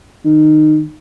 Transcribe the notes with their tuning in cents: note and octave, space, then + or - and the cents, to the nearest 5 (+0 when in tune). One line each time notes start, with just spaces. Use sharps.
D#3 -20